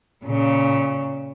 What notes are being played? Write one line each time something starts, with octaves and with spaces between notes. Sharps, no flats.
A#2 C#3